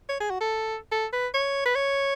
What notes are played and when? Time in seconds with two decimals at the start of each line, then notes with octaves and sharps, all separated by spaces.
0.09 C#5
0.20 G#4
0.30 F#4
0.41 A4
0.92 A4
1.13 B4
1.34 C#5
1.66 B4
1.75 C#5